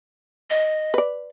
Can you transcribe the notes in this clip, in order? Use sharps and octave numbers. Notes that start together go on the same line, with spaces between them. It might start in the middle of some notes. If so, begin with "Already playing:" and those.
D#5
B4 D5